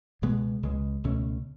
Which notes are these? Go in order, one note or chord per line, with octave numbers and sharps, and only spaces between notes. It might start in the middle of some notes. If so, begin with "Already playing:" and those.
C#2 B2 G#3 B3
C#2 C#3 G#3
C#2 B2 A3 C#4